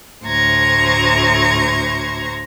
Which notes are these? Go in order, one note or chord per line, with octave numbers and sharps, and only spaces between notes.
D2 A2 C5 A#5 C#6 G#6